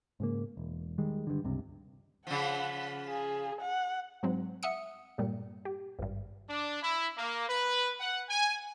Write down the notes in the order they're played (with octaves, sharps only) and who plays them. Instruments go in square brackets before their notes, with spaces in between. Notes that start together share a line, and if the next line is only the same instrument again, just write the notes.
[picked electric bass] G#2 C#3 A#3
E1
D#3 G3 G#3
G2 D3
C#2 G2 C3
[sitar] C#3 F3 [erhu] F#5
[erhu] G#4
F#5
[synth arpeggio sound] G#2 F#3 C4
E5 F#5 D#6 C#7
G2 A#2 G3
G4
G#1 G2
[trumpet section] D4
E4
A#3
B4
F#5
G#5